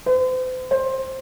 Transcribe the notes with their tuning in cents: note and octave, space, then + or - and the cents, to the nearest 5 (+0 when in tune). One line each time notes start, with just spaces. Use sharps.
C5 -40
C5 +15